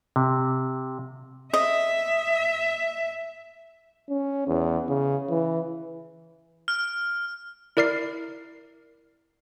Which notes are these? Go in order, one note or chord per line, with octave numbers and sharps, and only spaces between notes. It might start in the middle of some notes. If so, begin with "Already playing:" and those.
C3
D#5 E5
C#4
E2
C#3
E3
F6
E4 A#4 D5 F6 C7